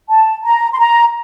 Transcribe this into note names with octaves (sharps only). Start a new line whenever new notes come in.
A5
A#5
C6
A#5